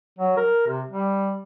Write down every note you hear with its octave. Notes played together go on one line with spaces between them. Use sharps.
F#3
A#4
C3
G3